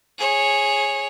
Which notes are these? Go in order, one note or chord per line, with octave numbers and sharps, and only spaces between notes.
G#4 C#5